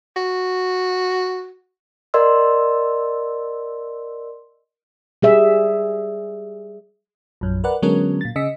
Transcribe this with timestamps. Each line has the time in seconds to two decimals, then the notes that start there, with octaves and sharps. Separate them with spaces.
0.17 F#4
2.14 A#4 D5 D#5 C6 E6
5.22 G3 G#4 E5
7.41 A#1 F#2
7.64 A#4 B4 D5 F#5
7.82 D3 F#3 G#3 B3 C#4 A#4
8.21 A#2 A6
8.36 C#3 D#5 E6 B6 C#7